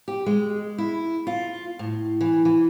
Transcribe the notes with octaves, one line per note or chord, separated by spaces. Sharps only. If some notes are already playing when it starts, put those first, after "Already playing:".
G4
G#3
E4
F4
A2
E3
E3